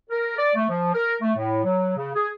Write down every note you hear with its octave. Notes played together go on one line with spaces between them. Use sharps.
A#4
D5
A3
F3
A#4
A3
A2
F#3
C#3
G#4